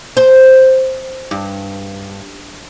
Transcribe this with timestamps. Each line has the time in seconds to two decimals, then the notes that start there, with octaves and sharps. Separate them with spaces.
0.17 C5
1.31 G2